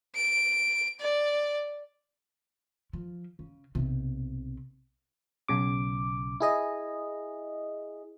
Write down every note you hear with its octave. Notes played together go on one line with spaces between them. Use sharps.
D7
D5
F3
C#3
B1 C3
B1 C#3 D6
E4 G#4 D#5